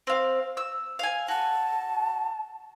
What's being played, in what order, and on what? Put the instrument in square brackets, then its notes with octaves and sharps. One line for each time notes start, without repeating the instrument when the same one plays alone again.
[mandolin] C4 F5
E6
F5 G#5
[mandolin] F#4 [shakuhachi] A5